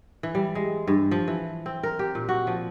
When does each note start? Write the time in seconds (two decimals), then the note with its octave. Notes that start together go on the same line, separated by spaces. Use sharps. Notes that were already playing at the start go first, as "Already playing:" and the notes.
0.23 E3
0.35 G3
0.55 G#3
0.87 G2
1.11 F3
1.28 E3
1.66 C4
1.83 A#4
1.99 G4
2.15 A#2
2.29 F#4
2.47 F3